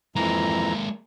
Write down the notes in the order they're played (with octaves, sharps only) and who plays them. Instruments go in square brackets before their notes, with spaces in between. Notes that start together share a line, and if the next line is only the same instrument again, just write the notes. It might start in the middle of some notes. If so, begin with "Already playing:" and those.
[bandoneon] F2 E3 A#5 [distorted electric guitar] G#3 A#3